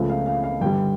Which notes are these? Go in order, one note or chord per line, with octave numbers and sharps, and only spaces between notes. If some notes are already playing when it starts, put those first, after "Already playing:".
Already playing: C#2 C#3 F3 A3
F5
F5
F5
G2 D3 G3 G5